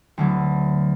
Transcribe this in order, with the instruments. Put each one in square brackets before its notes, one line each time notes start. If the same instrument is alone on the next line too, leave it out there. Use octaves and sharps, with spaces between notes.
[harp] D2 D3 F#3 B3